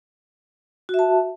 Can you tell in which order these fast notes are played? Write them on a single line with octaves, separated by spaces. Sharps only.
F#4 E5 A5